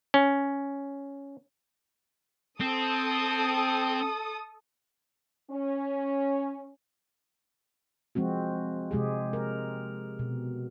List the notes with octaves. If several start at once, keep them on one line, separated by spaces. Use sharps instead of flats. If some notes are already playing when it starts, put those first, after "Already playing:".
C#4
C4 A4 D#6
C#4
F3 G#3 C4 F#4
C3 G#3 G4 G#4
A#4
B2